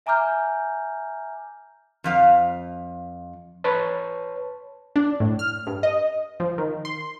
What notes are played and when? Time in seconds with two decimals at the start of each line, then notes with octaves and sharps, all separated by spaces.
0.06 E5 G#5 A#5 D6 F6 G6
2.04 F2 F3 F5
3.64 B4 C#5 A5
4.96 D4
5.20 A2
5.39 F6
5.67 G2
5.83 D#5
6.40 F3
6.58 D#3
6.85 C6